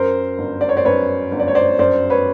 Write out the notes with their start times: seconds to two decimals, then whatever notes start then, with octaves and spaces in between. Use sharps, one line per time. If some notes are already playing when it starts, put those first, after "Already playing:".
Already playing: F#2 A#4 C5
0.38 G1
0.61 D5
0.69 C#5
0.77 C5 D5
0.85 F#2 B4 C#5
1.31 G1
1.40 D5
1.48 C#5
1.55 C5 D5
1.79 F#2 C5 D5
2.10 B4 C#5